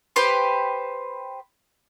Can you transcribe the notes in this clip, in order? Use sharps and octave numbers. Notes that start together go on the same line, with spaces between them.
G4 B4 C5 C6